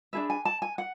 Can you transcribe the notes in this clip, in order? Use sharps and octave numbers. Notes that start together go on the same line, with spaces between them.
D4 G#4 B4 E5
G#5
A5
G#5
F#5